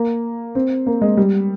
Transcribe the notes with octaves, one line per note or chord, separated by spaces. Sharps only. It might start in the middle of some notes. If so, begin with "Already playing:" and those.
Already playing: A#3
C4
A#3
G#3
G3